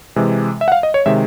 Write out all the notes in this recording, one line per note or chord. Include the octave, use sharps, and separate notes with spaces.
C3 E3 G#3
E5
F#5
F5
D#5
C#5
C3 D#3 G#3 E5